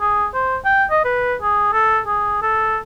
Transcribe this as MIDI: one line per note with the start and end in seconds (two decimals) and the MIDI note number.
0.01 0.27 68
0.34 0.57 72
0.65 0.84 79
0.90 1.00 75
1.05 1.35 71
1.42 1.70 68
1.73 1.99 69
2.06 2.39 68
2.42 2.78 69